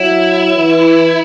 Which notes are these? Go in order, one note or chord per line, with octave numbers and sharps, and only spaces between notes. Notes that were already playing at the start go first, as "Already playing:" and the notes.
Already playing: F#3 E4
E3